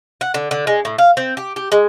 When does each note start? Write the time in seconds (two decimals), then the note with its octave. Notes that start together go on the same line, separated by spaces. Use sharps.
0.21 F#5
0.34 D3
0.51 D3
0.67 G#3
0.85 A2
0.98 F5
1.17 C4
1.37 G4
1.56 G4
1.72 G#3